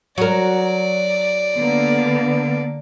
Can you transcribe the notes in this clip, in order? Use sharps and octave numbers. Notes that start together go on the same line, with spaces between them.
F#3 A#4 D5
D3 A#3 B3